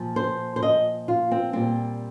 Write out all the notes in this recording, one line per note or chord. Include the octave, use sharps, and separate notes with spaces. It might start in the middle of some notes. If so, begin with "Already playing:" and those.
Already playing: A#2 F3
C5
C5
D#5
F4
C4
A#2 G3 C4